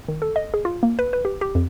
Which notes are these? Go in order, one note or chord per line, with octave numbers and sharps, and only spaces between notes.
D#3
A4
D#5
G#4
F4
A#3
B4
B4
G4
G4
F2